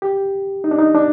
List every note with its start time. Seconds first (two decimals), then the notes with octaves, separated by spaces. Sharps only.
0.02 G4
0.64 D#4
0.71 D4
0.79 D#4
0.95 D4